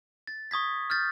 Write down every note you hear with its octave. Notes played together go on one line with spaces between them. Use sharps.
A6
C#6 D#6 G#6 B6
F6 G6 A6